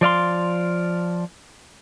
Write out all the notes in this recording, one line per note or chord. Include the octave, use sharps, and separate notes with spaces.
F3 D5 F5 C6